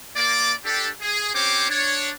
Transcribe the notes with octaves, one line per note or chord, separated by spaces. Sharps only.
A#3 D5 D6
D4 G4 A4
G#4
C4 C#4 G4 C5 C#5 D6
D4 C#5